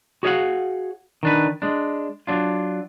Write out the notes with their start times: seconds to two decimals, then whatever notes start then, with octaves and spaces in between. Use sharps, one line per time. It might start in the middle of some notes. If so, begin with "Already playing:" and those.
0.23 F#4 G#4 C#5 D#5 F5 F#5
1.23 D#3 D4 B4
1.62 G#3 D4
2.27 F#3 D4 F4